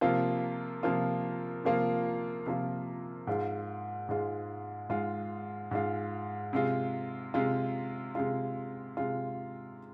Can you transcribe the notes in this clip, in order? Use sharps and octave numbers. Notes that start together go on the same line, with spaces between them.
C3 F3 A#3 F4
C3 F3 A#3 F4
C3 F3 A#3 F4
C3 F3 A#3 F4
G#2 G#3 F4
G#2 G#3 F4
G#2 G#3 F4
G#2 G#3 F4
C3 G#3 F4
C3 G#3 F4
C3 G#3 F4
C3 G#3 F4